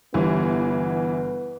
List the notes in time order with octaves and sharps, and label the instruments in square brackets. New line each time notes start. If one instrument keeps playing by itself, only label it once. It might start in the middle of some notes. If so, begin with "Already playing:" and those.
[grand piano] G1 G3 [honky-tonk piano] E3 [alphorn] B3